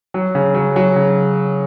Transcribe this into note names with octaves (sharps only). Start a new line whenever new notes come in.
F#3
C#3
F#3
F#3
C#3